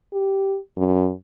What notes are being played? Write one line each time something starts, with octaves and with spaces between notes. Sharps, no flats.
G4
F#2